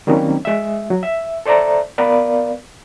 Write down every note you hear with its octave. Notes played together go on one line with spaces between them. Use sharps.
D#3 F#3 G3 A#3 C4 C#4
G#3 E5
F#3
E5
A4 C5 D5 E5 A#5
B3 A#4 B4 D5 F5